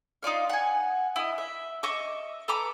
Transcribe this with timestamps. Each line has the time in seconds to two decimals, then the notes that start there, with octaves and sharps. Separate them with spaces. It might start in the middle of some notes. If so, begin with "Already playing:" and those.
0.23 D#4 F4 D5 F5
0.49 F#5 G#5
1.16 E4 D#5
1.38 E5
1.83 D#5 E5 C#6 D6
2.48 A4 B4 A#5 D6